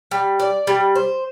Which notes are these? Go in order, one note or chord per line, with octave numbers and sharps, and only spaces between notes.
G3
D5
G3
C5